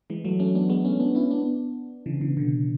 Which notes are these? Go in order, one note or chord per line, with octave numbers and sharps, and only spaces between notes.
E3 G#3
F#3 A3
A3 C#4
B3 D4
G#3 B3
A3 C#4
B3 D4
C#4 E4
B3 D4
C#3 E3
C#3 E3
B2 D3